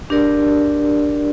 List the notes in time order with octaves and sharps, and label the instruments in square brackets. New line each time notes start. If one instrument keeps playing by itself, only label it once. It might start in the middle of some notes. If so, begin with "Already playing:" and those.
[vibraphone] D4 G4 A#4 D5